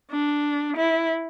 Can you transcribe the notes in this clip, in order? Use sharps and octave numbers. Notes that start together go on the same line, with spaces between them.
D4
E4